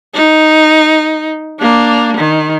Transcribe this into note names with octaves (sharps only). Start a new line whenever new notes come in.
D#4
A#3 D4
D#3